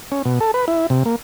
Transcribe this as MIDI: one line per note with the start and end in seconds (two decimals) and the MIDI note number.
0.12 0.22 61
0.25 0.39 47
0.40 0.51 69
0.54 0.65 71
0.68 0.87 64
0.90 1.03 48
1.05 1.16 58